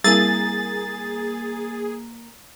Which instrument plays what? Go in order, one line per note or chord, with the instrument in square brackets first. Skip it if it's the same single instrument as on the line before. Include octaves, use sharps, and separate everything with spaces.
[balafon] G3 C4 E4 [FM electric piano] A#3 A#5 [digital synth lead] G#4 [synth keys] A6